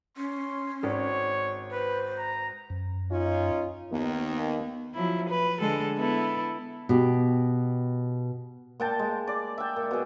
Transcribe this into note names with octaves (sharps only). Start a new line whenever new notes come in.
C#4 C6
G#1 C#5
B4 C5
A#5
F#2
C#4 D#4 F4
D#2 D#3 B3
F3 F#3 E4
B4
D3 G#3 A4
B3 E4 A4
B2 G4
A#2 G5 A5
G#3
D5
E5 G5
A#2
B2 G#4